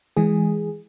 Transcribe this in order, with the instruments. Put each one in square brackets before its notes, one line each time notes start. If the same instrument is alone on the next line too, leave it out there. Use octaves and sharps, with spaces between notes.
[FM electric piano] E3 G#3 G#4